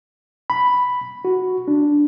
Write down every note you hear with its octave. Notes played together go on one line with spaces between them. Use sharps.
B5
F#4
D4